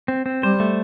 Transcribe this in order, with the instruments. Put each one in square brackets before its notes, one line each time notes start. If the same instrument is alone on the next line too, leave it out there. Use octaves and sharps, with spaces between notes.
[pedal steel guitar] C4
C4
[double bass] G3 [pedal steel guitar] C5
[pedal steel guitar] A3